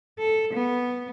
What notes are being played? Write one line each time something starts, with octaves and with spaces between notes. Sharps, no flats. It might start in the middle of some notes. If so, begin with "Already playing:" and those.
A4
B3